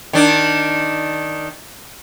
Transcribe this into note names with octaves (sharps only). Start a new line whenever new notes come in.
D#3 D4